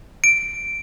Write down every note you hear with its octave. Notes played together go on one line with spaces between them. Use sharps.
D7